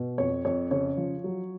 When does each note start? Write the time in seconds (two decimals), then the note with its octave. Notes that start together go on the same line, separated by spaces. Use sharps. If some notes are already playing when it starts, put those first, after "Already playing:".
Already playing: B2
0.18 F2 C#5
0.45 F2 C#5
0.71 C#3 C#5
0.97 F3
1.24 F#3